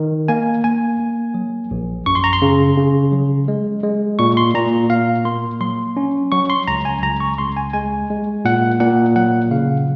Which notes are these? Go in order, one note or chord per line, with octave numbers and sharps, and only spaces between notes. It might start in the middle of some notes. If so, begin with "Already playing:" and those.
Already playing: D#3
A#3 G#5
A#3 G#5
A#3
F#3
A#1
F#2 C#6
C6
A#5
C6
C#3
C#3
F#3
G#3
G#3
A#2 C#6
C6
A#2 A#5
A#2 F5
A#3 C6
F#3 C6
C#4
F#3 C#6
C6
C#2 A#5
G#5
C#2 A#5
C#6
C#2 C6
G#5
G#3 G#5
G#3
A#2 F#5
A#2 F#5
F#3 F#5
C#3 F5